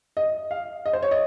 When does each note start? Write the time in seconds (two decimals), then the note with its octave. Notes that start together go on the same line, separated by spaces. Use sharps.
0.17 D#5
0.51 F5
0.86 D#5
0.93 C5
1.03 C#5
1.11 D#5